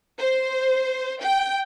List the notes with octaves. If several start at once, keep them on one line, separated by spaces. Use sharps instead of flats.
C5
G5